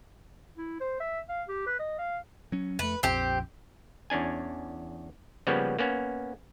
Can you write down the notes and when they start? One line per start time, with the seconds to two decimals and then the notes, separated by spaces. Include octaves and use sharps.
0.58 E4
0.80 C5
1.00 E5
1.29 F5
1.48 G4
1.67 B4
1.80 D#5
1.98 F5
2.52 F#3 C#4
2.79 F2 A3 B4
3.03 A#1 F2 C4 G4
4.10 E2 C#4 D4 G#5
5.47 C#3 F3 G3 A#3 B3 C#4
5.79 A#3 B3 C#4